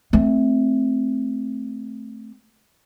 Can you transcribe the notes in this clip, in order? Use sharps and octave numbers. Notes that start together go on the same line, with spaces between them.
A3 C4